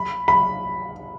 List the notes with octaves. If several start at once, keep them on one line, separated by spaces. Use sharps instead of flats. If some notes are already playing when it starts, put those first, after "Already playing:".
Already playing: B5
B5